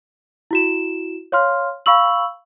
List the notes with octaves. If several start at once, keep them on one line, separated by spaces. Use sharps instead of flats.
E4 F#4 E7
C#5 F5 C6 F6
F5 B5 C#6 E6 F#7